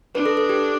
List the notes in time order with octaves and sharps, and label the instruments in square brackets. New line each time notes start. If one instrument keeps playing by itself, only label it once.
[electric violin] D4 [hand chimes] B4
[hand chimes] A4
A4
G4